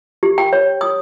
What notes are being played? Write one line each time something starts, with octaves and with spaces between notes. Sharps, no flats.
G4
G5
C#5
D#6